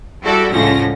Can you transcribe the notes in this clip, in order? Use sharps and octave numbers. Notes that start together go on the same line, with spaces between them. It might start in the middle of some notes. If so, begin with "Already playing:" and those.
G3 E4 F#4 G4 A4 D5
C#2 A2 D3 F3 C#4 A#6